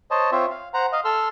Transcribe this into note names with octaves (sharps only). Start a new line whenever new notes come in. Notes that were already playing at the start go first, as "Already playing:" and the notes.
C5 C#5 D#5 A5
C4 F4 C5 C#5 E5
F5
C5 F#5 A#5
D#5 F5
A4 C6 E6 F6